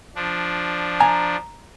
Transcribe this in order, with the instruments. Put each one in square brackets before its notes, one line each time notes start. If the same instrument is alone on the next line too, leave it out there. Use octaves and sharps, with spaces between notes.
[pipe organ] F3 D4
[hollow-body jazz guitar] G#5 A#5